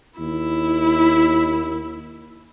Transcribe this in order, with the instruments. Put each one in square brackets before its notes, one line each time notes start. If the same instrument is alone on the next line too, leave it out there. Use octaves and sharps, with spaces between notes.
[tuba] D#2 [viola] E4